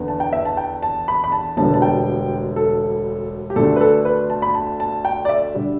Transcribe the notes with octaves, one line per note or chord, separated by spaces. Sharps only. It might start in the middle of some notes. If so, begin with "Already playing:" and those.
Already playing: E2 D3 B3
A5
G5
E5
A5
G5
A5
B5
B5
A5
E1 D2 D3 G3 B3 A5
A5
G5
A4
G4
D2 D3 A3 D4 A4
B4
A4
B4
A5
B5
A5
A5
G5
D5
E5
D3 G3